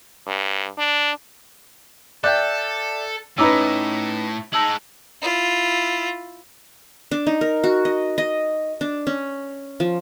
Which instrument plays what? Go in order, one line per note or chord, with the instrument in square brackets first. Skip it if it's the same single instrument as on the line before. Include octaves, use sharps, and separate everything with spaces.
[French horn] G2
D4
[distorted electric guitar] A4 [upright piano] D5 E5 G5 [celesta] F#6 G6
[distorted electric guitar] A2 [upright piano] C#4 D#4 B4 [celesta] A#5 D6 E6
[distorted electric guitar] G#3 D#4 [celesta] A5 E6 F#7
[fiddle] E4 F4
[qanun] D4
D#4
A#4
F#4
D#5
D#5
D4
C#4
F3